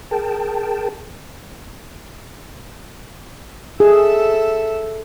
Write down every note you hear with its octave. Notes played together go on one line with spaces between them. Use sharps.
G#4 A#4 G5 A5
G#4 A4 E5